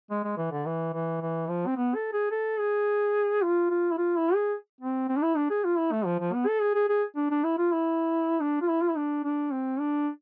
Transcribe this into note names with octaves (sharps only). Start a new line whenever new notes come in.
G#3
G#3
E3
D3
E3
E3
E3
F3
C4
B3
A4
G#4
A4
G#4
F4
F4
E4
F4
E4
G#4
C4
C4
D4
E4
D4
G#4
F4
E4
A3
F3
F3
B3
A4
G#4
G#4
G#4
D4
D4
E4
F4
E4
D4
F4
E4
F4
E4
D4
D4
C4
D4